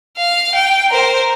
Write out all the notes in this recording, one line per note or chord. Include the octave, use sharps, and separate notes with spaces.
F5
G5
A#4 C5